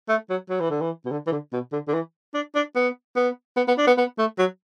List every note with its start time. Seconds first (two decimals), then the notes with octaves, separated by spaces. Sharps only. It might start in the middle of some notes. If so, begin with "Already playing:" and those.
0.09 A3
0.30 F#3
0.50 F#3
0.60 E3
0.70 D3
0.81 E3
1.05 B2
1.11 D3
1.27 E3
1.32 D3
1.53 B2
1.72 D3
1.88 D3
1.93 E3
2.34 D4
2.55 D4
2.76 B3
3.16 B3
3.57 B3
3.68 B3
3.78 D4
3.87 B3
3.98 B3
4.18 A3
4.39 F#3